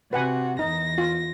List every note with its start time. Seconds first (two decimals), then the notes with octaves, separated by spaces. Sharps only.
0.13 C3 F#4 B4 F#5 G#5
0.59 E2 D#4 A#6
0.98 F4